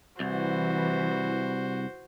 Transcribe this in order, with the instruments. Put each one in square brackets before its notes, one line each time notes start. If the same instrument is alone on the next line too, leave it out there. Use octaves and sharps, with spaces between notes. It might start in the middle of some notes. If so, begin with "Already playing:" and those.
[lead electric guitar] C2 [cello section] E3 [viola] F#4 C5